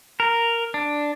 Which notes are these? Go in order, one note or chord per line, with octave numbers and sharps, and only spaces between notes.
A#4
D4